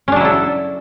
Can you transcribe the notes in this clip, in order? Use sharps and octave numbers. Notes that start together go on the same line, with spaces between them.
F#3 C#4 D4 E4 A4